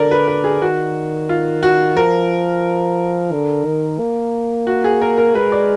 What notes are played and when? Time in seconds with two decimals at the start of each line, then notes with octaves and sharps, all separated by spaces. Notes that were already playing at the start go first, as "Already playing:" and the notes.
Already playing: D3 A#4 D5
0.11 B4
0.28 B4
0.44 G#4
0.62 D#3 F#4
1.29 F4
1.63 F#4
1.97 F3 A#4
3.32 D3
3.66 D#3
3.99 A#3
4.67 F#4
4.84 G#4
5.02 A#4
5.18 A#4
5.35 G#3 B4
5.52 D5